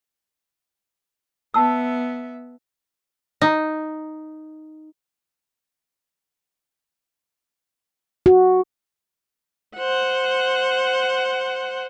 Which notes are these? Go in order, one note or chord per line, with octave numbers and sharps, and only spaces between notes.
B3 E5 A5 E6
D#4
F#4
C5 F#5